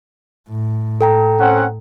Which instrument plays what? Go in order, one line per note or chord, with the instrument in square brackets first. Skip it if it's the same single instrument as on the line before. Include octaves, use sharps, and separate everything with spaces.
[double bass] A2
[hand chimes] A4 G5 A#5
[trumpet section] C4 C#4 F#5